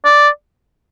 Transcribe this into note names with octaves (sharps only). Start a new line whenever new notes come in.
D5